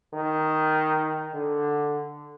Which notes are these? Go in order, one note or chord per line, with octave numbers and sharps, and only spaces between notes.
D#3
D3